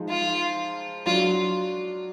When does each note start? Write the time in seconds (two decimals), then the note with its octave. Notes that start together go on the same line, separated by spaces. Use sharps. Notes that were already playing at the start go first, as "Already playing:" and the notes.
Already playing: F3 G#3 D#4
0.09 F4
1.06 F#3 D4 F4 F#4